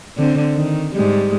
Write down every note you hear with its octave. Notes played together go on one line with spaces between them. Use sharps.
D3 C4
D#3
G#2 G3 G#3